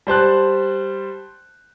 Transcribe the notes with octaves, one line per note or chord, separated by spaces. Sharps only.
G3 C5 A5 F#6